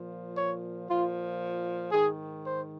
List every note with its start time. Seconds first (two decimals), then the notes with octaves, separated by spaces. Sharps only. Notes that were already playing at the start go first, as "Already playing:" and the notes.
Already playing: A#2 F3
0.37 C#5
0.89 A#2 F3 F4
1.92 G#2 D#3 G#4
2.45 C5